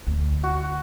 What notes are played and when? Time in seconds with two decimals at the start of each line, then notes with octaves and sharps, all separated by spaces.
0.07 D2
0.43 F#4